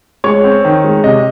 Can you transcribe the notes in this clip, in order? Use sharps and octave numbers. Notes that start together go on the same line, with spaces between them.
G#3 C#5 C#6
C4
D#3
G#3
C3 D#5